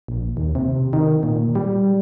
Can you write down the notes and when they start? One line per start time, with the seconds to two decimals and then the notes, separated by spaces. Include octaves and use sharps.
0.08 A#1
0.37 D#2
0.55 C3
0.93 D#3
1.23 A#2
1.55 G3